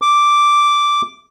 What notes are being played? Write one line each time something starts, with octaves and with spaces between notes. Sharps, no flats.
D6